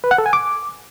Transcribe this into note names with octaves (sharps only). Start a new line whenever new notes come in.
B4
F#5
A4
G#5
D6